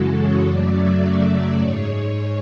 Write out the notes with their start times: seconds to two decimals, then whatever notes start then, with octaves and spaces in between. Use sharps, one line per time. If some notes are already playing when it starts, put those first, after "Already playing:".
Already playing: F#2 C#3 E3 G#3 F#4 A4
0.18 C#5
0.47 F#2 C#3 F#3 A3 D5
0.75 E5
1.04 D5
1.32 D5
1.60 G#2 G#3 C#5